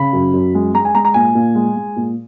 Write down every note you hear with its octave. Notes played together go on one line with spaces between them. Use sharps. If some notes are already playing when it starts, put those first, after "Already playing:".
Already playing: C#3 B5
F#2
F#2
G#3
G#3 A#5
G#5
G#3 A#5
A#5
A#2 G#5
A#2
G#3
G#3
A#2